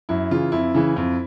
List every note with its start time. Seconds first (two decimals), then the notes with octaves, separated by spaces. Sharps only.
0.09 F#2 E4
0.31 C#3 E3 F4
0.52 F2 E4
0.75 C#3 E3
0.96 F2